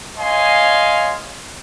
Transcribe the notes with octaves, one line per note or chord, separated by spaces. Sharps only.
C#5 D#5 F5 G#5 C6